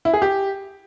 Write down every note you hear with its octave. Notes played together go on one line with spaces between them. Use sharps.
E4
G#4
G4